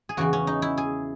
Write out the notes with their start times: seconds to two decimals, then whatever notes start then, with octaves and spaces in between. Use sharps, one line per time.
0.09 G#4
0.17 E2 C#3 E3 F#4
0.33 C#4
0.47 D#4
0.62 E4
0.78 G#4